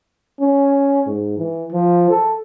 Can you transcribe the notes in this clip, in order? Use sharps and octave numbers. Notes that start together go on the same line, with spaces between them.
C#4
G#2
E3
F3
A4